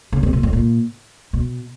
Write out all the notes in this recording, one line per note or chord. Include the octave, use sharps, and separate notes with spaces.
C#3
C3
A#2
A2
A#2
B2